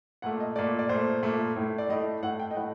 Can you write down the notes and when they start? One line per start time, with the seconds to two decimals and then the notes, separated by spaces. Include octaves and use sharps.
0.22 A#2 A3 F#5
0.40 D#5
0.56 A#2 A3 D5
0.79 D5
0.89 A#2 A3 C5
1.23 A#2 A3
1.56 A2 A3
1.78 D5
1.89 A2 A3 D#5
2.23 A2 A3 F#5
2.39 G5
2.51 D#5
2.56 A2 A3 F#5